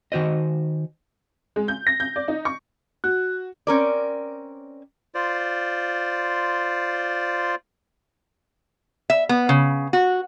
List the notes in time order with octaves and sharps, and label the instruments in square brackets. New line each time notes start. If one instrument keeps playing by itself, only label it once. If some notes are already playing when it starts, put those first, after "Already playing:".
[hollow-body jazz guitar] D#3 F#4 C5 D#5
[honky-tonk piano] G#3
G6
A#6
G6
D5
D#4
C#6
[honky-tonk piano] F#4 [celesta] F#6
[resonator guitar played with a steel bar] C4 C#4 A#4 D5
[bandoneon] F4 C5 D5
[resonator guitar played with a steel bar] E5
B3
C#3
F#4